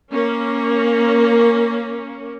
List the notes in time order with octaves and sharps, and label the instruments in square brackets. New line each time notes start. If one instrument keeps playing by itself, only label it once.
[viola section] A#3 C#4